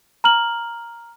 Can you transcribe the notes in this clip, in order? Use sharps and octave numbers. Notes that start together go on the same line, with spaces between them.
A#5 F6 F#7